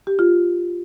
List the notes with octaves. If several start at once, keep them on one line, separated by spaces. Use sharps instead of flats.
G4
F4